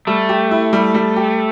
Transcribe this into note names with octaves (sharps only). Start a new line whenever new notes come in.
G3 A3
G4
E4
G3
G3
G4